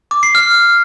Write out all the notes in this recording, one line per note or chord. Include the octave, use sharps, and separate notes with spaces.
D6
C7
F6